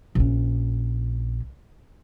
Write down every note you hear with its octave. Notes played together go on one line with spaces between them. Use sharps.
A#1 C#4